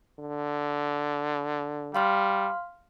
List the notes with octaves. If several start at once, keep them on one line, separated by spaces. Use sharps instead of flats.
D3
G3 F5 C6 F6